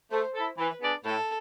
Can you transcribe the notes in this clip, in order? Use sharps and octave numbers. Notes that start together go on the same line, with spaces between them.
A3 C5
E4 A4
E3 B4
B3 D4 G#4 D5
A2 A4